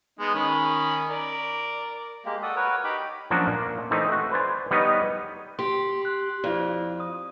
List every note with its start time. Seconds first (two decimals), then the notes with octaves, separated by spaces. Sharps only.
0.19 G#3 B3 D#4
0.35 D#3 C#4 B5
1.10 A#4 D5
2.25 G#3 A#3 G4
2.43 F#4 A4 D5 D#6
2.56 F#4 A#4 B4 C#5
2.84 D#4 G4 B5 D6
3.31 F3 F#3 A#3 C#4 D4 F#4
3.47 A#2
3.91 E3 A3 C4 D#4
4.08 A3 F#4
4.31 B4 C5 D5 G#5
4.71 G3 B3 D#4 B4 C#5 D#5
5.59 G4 C6
6.02 C6 F#6
6.44 F2 E4 D5
7.00 D#6